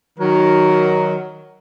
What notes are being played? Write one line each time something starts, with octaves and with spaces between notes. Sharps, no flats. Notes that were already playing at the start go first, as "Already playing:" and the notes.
D#3 F#3 A#4